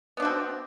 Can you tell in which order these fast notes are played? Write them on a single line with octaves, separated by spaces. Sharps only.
B3 D4 F#4 C4